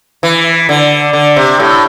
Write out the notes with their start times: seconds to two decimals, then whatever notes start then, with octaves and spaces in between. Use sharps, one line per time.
0.23 E3
0.69 D3
1.13 D3
1.36 C3
1.60 A2